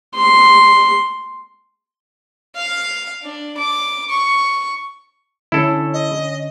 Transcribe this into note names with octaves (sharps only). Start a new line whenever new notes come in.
C6
F5
D4
D6
C#6
D3 C#4 E4 A4
D#5